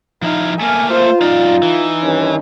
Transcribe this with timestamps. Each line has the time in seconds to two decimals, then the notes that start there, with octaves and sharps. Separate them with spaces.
0.22 F3 D#4 E4 F5
0.61 A3 A#3 G#5 F6
0.91 F4 C5
1.22 F#2 D#4 D5 F5
1.63 E3
2.03 G2 D#3 C#4